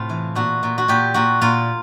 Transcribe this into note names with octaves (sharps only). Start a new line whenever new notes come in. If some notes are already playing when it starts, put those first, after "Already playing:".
Already playing: A2 C3 F4
E3
A#2 F#4
A#2
F#4
A#2 G4
A#2 F#4
A#2 F4